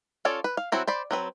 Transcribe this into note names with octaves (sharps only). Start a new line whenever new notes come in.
C#4 F4 A4 C#5 D5
B4
F5
F#3 C4 E4 F#4
C5 D5 B5
F#3 C4 B4